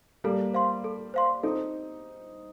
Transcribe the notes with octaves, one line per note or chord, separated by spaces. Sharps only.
G3 A#3 A4
C5 F5 C6
A4
C5 F5 C6
C4 D#4 A4